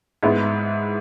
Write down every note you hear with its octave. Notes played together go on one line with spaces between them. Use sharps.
G#2 G#3 B3 E4